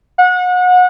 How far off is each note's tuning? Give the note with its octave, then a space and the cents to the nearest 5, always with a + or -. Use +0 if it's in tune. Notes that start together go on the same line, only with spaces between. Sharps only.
F#5 -30